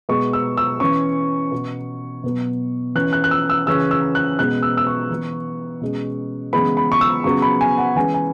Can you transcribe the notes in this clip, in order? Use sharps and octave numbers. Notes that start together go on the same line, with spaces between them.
B2 G#3 B3 C#6
E6
E6
E3 C#4 C#6
B2 B3
B2 F#3 B3
E3 C#4 F#6
F#6
F#6
E6
E6
C#3 E3 C#4 E6
E6
F#6
B2 G#3 B3 F#6
E6
E6
C#6
E3 B3
B2 G#3 C#4
C#3 E3 G#3 B3 B5
B5
C#6
E6
C#3 F#3 B3 C#6
B5
G#5
F#5
E3 G#3 C#4 G#5
G#5